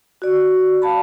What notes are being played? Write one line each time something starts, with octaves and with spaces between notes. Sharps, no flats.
F#4 D5
F5 A5 B5